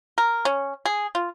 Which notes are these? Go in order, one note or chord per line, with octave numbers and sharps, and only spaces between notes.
A#4
C#4
G#4
F4